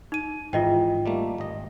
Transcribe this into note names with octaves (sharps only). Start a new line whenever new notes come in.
D#4 D#7
G#1 G#2 E3 F4 D#5 G5
G3 A3 A#3
G#1 D#5